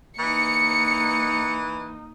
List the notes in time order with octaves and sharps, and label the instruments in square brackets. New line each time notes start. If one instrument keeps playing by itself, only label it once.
[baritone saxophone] E3 [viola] A#3 D#4 [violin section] C#7